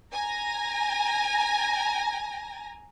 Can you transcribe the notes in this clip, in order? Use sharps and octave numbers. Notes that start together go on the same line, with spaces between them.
G#5 A#5 A#6